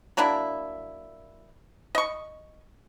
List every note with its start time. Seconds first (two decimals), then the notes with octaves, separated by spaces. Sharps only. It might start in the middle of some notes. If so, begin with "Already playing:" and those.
0.17 F#3 A#3 D4 E4
1.95 D#5 C#6